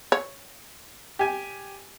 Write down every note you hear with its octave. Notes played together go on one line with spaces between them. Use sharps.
C#5
G4 G#5